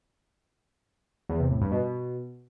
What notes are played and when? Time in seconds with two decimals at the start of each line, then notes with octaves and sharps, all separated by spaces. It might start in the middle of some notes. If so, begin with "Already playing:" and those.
1.29 E2
1.40 C3
1.51 A2
1.61 G2
1.72 B2